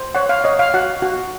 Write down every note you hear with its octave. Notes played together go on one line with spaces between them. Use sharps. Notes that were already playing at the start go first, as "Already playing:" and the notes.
Already playing: C5
C#5 F#5
F5
C#5 D#5
F5
F#4 F#5
F#4